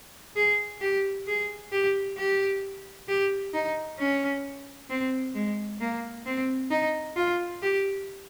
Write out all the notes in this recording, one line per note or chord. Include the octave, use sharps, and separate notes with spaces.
G#4
G4
G#4
G4
G4
G4
D#4
C#4
C4
G#3
A#3
C4
D#4
F4
G4